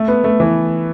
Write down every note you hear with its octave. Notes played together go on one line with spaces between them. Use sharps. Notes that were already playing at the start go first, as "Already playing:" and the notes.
Already playing: A3
B3
A3
E3